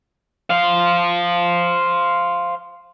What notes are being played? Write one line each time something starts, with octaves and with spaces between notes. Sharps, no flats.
C5 F5